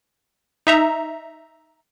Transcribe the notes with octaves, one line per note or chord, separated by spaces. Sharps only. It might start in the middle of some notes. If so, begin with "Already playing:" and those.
D#4 E5 A#5